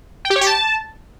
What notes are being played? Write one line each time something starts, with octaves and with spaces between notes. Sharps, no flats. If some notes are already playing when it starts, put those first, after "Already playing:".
G5
G4
C#5
G4
A5